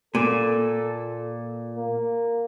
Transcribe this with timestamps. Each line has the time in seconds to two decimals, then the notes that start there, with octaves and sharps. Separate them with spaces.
0.15 A#2 A4
1.76 A#3